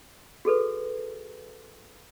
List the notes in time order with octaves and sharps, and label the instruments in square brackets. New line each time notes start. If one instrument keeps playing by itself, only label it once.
[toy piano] F#4 G#4 A4 B4